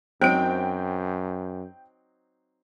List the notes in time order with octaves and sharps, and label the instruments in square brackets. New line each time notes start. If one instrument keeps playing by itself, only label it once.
[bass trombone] F#2 [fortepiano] F#3 C4 D#4 [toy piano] C5 [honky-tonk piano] G5 D7